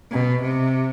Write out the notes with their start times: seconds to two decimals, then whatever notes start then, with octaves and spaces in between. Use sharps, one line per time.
0.12 B2
0.43 C3